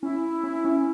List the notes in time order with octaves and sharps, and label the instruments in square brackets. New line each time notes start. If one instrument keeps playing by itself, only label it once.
[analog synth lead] C#4 [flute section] E4
[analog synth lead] C#4
C#4